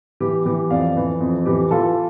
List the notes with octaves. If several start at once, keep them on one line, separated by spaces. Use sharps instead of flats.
E3 G4
E3 G4
F2 D5 F5
E3
F2
E3 G4
E3 F4 A4